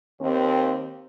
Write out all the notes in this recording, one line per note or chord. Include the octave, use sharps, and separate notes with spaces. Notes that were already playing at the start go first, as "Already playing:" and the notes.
D#2 C4